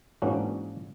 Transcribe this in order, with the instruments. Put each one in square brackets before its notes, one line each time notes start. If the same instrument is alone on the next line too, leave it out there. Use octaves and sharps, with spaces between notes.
[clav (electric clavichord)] G#2 E3 A#3 C#4 D4 F#4